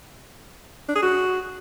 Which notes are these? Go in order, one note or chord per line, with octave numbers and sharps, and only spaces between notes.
D4
G#4
F#4